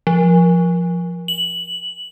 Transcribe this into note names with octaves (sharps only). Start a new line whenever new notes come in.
F3
F#7